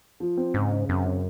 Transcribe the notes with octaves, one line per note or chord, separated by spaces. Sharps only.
F3
C4
G#2 C#3
C#3
F#2 C4
C#3